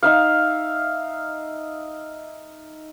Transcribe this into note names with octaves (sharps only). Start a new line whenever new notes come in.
D#4 E5 F5